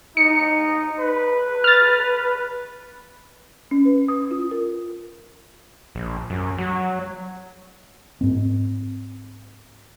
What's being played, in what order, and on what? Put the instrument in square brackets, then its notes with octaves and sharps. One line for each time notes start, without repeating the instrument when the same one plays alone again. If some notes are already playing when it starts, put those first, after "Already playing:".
[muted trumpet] D#4 [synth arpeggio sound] C#7
[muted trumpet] B4
[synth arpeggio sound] F6 A6
[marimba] C#4
B4
D#6
F4
A#4
[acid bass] A#1
F#2
F#3
[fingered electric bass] G#2 C4